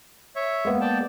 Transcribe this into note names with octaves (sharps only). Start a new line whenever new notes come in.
C#5 E5
G#3 A#3 B3
D5 G5 A5